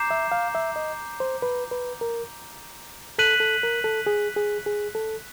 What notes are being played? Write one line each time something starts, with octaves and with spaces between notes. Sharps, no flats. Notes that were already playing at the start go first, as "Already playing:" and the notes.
Already playing: A#5 D6 G6 C7 E7
E5
F5
E5
D#5
C5
B4
B4
A#4
A4 F#6 B6 D#7 F#7
A4
A#4
A4
G#4
G#4
G#4
A4